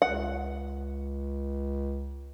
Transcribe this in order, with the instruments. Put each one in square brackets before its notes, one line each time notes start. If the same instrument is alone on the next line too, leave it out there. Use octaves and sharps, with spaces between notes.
[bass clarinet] C#2 [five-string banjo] F#5